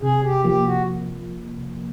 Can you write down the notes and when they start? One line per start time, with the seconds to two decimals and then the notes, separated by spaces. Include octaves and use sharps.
0.02 C3 G#4
0.24 G4
0.44 F3 A#3 G4
0.66 F#4